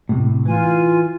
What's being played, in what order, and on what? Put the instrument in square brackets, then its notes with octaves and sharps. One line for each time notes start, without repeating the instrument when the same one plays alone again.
[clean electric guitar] A2 C3
[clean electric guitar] E3 [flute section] F4 G#5